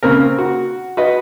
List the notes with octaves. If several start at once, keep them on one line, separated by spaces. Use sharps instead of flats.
C#3 A#3 C4 A#4
F#4
F#4 B4 D#5